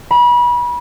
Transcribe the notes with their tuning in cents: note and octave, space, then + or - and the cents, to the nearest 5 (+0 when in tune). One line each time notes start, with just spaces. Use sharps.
B5 -30